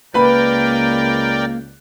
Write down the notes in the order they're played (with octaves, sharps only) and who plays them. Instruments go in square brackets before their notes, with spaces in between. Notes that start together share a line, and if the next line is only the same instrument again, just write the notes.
[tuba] C#2 [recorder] A#3 [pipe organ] A#4 D5 G5 [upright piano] B4 B5